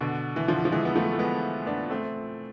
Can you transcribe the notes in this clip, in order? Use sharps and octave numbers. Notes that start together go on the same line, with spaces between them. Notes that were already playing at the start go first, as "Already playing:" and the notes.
B2 D3
E3
D3 F3
F3
E3 G#3
B3
F3 A3
A3
G#3 B3
B3 D4
A3 C4